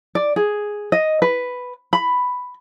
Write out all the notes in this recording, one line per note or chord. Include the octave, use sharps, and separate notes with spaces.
D5
G#4
D#5
B4
B5